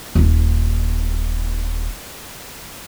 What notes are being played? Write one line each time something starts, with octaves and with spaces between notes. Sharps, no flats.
D#1 D#4